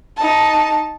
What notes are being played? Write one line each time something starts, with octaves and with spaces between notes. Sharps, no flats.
D#4 A5